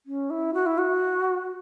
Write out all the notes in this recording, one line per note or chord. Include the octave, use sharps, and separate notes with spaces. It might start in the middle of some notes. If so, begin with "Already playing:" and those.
C#4
E4
F#4
E4
F#4